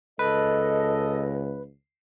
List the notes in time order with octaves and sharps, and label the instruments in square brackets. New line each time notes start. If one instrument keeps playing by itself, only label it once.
[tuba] C#2 [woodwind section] A4 D#5 [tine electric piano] B4